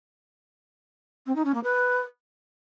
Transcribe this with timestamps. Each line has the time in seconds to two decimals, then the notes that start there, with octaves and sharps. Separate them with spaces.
1.26 C4
1.36 D#4
1.45 C#4
1.54 A#3
1.63 B4